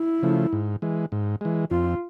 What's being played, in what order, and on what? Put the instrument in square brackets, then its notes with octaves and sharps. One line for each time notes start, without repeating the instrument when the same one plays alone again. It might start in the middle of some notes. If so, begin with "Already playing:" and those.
Already playing: [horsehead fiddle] E4
[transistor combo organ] C#3 F3 A3
G#2
E3 G#3
G#2
E3 G#3
[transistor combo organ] F2 [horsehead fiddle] F4